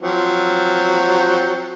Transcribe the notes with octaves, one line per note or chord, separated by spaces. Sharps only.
F3 F#3 C4